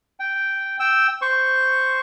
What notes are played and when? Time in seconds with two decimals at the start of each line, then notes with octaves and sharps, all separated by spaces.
0.20 G5
0.80 G5 E6
1.22 C5 C#6